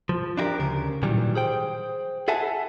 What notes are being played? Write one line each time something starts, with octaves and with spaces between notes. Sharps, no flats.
F3
D4 E4 G4 A#4
D2 C#3 A#4
A#2 D#3 E3 F#3 G3
G#4 C5 G5
G#4 A4 E5 F#5 G#5 A5